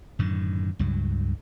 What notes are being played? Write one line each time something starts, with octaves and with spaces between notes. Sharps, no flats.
F#2 A2 D3 D#3
C#2 G2 F#3